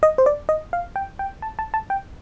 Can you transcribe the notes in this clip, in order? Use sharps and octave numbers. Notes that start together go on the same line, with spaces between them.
D#5
C5
D5
D#5
F5
G5
G5
A5
A5
A5
G5